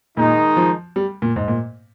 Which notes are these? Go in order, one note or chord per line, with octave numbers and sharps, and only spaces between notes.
A#2 D#3 G#3 D#4
F3
G3
A#2
G#2
A#2